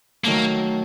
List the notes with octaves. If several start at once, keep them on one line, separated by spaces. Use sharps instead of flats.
D#3 F#3 A3 A#3